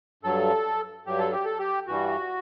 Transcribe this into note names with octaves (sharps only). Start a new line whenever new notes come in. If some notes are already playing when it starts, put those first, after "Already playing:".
G2 F#3 A4
G2 F#3 G4
A4
G4
A4
G4
G2 E3 G3 F#4